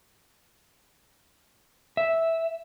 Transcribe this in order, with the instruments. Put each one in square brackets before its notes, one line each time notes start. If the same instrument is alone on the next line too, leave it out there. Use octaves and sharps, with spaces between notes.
[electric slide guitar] E5